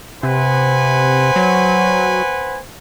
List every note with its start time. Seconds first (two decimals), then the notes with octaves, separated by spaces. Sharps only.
0.23 C3 B4 C5 F#5 G#5
1.36 F#3